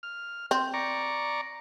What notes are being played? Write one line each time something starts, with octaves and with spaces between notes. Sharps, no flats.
F6
C4
D5 A#5 C#6